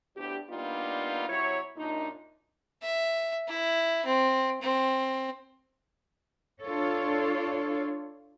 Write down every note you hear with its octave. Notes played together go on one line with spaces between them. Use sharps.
D2 A2 B3 D4 G4
G3 A#3 B3 D4 D#4 F4
C3 F#3 E4 C#5
F#2 A#2 D4 D#4
E5
E4
C4
C4
D4 F4 A4 C#5